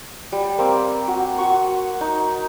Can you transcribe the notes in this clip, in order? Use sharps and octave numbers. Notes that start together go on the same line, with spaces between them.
G3
A#3 C4
F#4
F#4 C#6
D#4